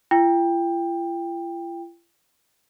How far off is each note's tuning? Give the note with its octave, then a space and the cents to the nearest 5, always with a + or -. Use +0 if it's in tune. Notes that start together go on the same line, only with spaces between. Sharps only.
F4 -45 G5 +15